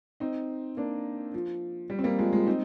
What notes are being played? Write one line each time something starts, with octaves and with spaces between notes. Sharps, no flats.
C4 D#4
A#3 D4
F3
G3
C4
G3 A#3
F3 G#3
F3 G#3
C4 D#4